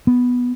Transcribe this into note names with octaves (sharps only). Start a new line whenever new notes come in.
B3